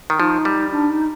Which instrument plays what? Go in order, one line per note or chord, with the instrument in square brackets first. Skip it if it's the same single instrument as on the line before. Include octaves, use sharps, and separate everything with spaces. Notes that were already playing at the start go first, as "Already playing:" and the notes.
[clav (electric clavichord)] D#3
[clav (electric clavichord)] F3 [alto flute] D#4
[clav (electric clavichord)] G3
[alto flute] D4
D#4